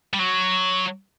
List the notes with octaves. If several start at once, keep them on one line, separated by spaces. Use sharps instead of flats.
G3
F#3